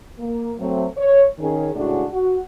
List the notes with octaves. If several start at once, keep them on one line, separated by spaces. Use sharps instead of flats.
A#3
F#3 A3 C4
C#5
D#3 C#4 G#4
A2 C#3 G#3 D4 F#4
F#4